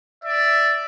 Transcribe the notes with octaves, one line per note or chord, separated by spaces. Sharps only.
D5 E5